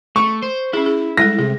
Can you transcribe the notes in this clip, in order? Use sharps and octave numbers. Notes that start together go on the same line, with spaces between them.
A3 C#6
C5
C#4 E4 G#4
G#4
G3 G#3 A4 A#6
C3 G#4